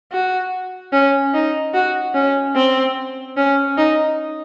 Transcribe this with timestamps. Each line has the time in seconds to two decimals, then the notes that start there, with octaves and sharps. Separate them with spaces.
0.12 F#4
0.93 C#4
1.34 D#4
1.74 F#4
2.15 C#4
2.55 C4
3.37 C#4
3.78 D#4